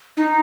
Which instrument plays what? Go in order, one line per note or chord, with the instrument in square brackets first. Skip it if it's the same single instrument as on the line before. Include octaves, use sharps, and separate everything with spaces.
[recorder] D#4